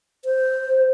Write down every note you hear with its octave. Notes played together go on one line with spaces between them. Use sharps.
C5